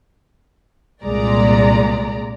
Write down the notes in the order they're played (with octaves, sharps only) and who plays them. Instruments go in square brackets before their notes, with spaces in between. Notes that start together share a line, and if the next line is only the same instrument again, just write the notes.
[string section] C2 A#2 G#3 D5 A#5